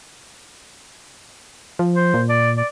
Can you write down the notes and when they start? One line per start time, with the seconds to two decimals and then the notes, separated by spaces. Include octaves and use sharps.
1.79 F3
1.96 C5
2.14 A#2
2.29 D5
2.57 D5